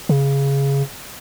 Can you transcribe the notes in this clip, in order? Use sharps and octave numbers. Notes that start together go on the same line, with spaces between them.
C#3